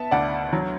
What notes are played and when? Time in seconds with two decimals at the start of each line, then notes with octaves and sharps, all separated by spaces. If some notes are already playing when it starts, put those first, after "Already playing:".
Already playing: B3 E5 A5
0.11 D2 D5 F#5
0.53 F#3